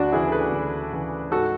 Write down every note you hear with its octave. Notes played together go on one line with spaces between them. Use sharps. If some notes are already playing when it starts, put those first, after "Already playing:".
Already playing: D2 D4 F#4
C#3 E3 E4 G#4
A4
G#4 B4
D2
C#3 E3
G#2 F#4 A4